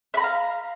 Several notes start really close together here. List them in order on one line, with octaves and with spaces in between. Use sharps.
E5 B5 A#5 F5